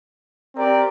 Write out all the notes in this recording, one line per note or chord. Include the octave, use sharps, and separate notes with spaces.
C4 G4 A#4 D5